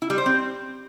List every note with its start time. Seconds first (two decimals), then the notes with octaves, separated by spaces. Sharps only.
0.02 E4
0.10 G3
0.18 C5
0.26 C4